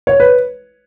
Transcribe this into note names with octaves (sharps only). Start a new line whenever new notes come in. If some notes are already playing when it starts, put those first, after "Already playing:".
C#5
B4